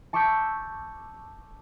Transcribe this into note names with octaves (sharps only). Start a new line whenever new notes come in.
A5 C#6 D6 E6 G6 B6